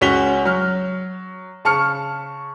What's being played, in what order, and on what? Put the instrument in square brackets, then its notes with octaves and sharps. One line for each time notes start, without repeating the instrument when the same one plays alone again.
[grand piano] C#2 C#4 F#4 B6 F7 G7
F#3 F6
C#3 A5 C#6 F6 C#7